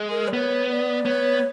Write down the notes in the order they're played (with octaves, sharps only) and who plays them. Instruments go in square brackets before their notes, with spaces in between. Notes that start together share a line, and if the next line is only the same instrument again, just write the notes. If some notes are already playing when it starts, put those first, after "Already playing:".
Already playing: [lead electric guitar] G#3
[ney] A#4
D5
[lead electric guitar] B3 [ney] C#5
[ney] D5
[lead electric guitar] B3 [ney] C#5